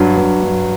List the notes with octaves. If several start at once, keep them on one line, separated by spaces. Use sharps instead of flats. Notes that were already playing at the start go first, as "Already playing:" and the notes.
Already playing: G2 F#3
G2
G2